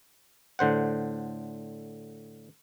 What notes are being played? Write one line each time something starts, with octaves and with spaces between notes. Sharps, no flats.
A2 D3 C5 F#5